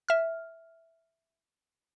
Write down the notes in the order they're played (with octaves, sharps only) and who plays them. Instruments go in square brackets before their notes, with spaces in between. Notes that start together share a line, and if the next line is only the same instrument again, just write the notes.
[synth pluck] E5 F6